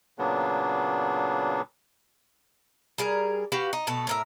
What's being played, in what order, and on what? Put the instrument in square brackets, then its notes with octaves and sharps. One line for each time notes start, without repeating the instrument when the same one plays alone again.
[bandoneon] A#2 C#3 F#3 A#3 B3 D4
[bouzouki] G3 G#4 A#4
F#4 G4 B4 F5
D#4
B2 A3 A5
A2 A#4 E5